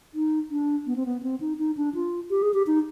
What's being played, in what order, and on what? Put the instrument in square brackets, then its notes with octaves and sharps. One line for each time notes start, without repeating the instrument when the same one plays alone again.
[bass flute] D#4
D4
B3
C4
B3
C4
D#4
D#4
D4
F4
G4
G#4
G4
D#4